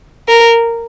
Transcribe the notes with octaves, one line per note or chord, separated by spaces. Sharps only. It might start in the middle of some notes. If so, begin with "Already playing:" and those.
A#4